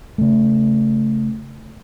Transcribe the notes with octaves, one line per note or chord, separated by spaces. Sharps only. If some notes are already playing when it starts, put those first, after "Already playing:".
C#3 A3